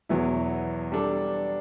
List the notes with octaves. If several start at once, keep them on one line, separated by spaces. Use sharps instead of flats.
E2 B2 F#3 B3 E4
G3 D4 A4